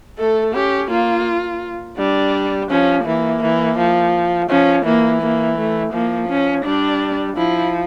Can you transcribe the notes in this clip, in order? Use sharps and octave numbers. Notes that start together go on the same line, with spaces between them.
A3 A4
C#4 G4
A#3 F4
G3 D4
F3 C#4
E3 A#3
E3
F3
F3 C#4
E3 A#3
A#3
A3
F3 A#3
C#4
G3 D4
F3 E4